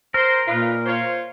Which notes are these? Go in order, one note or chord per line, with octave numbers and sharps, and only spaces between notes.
A#4 C5
A#2 D#4 F4 B4
F4 C5 C#5